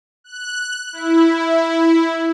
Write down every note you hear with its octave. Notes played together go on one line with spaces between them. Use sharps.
F#6
E4